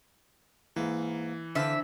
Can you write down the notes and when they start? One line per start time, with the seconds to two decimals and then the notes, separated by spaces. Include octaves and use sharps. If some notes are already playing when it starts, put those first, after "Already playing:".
0.76 G#2 E3 A#3
1.55 D3 C4 B4 E5 F5